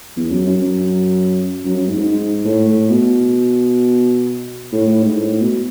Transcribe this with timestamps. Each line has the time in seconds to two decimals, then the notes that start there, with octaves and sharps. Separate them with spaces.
0.17 E2
0.31 F#2
0.46 F#2
0.61 F#2
1.64 F#2
1.76 F#2
1.88 G#2
1.98 G#2
2.45 A2
2.68 A2
2.90 B2
4.72 A2
4.87 A2
5.03 G#2
5.18 A2
5.41 B2